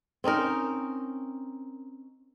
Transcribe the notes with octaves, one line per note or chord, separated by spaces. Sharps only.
C4 C#4 D#4 A#4